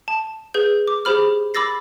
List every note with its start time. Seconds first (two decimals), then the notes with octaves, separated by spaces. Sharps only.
0.08 A5
0.54 G#4 B4 G6
0.88 D6
1.05 G4 G#4 C5 B5 F6
1.54 B5 D6 E6 A6 A#6 C7